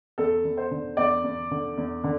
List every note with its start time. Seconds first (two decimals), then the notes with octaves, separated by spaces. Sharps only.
0.18 E2 A4
0.44 E2
0.57 C5
0.71 D3
0.97 E2 D5
1.24 E2
1.51 D3
1.78 E2
2.04 D3